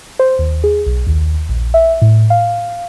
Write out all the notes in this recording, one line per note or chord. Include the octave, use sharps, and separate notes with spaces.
C5
D#2
G#4
B1
D#2
A#1
E5
A2
F5